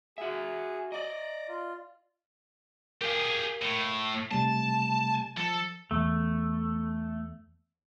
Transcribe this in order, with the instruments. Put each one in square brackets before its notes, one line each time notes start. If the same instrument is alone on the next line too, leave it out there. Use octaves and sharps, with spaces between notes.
[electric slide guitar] F#4 E5 [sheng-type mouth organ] G#4
[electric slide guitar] D5 D#5 [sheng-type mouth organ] A#5 D6
[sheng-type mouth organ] F4
[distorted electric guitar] G4 G#4 [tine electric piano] A#4 F5
[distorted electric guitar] A2
[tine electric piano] C3 G3 A3 [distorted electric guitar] A5
[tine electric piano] F3 [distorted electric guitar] A4
[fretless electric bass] E2 [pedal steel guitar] A3